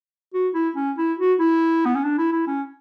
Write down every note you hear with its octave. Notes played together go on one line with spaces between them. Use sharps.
F#4
E4
C#4
E4
F#4
E4
B3
C#4
D4
E4
E4
C#4